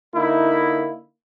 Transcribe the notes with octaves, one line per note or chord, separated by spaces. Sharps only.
D3 A#3 D#4 E4